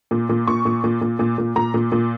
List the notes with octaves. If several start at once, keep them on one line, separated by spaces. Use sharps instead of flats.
A#2
A#2
A#2 C#6
A#2
A#2
A#2
A#2
A#2
A#2 A#5
A#2
A#2